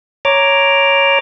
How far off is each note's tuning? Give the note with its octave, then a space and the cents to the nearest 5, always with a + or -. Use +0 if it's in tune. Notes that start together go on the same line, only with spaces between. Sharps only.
C#5 +0 A#5 +0 D6 +0